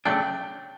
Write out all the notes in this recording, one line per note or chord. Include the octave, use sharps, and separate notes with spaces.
C#3 F#3 A3 D4 G5